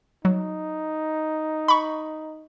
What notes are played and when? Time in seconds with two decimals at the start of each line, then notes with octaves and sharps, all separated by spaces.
0.25 F#3 D#4
1.68 B5 C#6